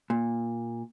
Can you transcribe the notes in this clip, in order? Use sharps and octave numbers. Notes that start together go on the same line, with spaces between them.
A#2